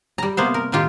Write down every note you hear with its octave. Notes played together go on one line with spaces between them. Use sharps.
G3 A#5
C3 A#3 B3 C5
A#4
A2 D#3 F4 G4